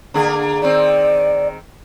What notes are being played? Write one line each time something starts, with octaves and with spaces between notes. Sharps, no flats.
D3 A#3 G#4
D#3 C4 D5